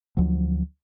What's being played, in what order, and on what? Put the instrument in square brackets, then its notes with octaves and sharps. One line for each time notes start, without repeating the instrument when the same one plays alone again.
[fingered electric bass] D2 F3 F#3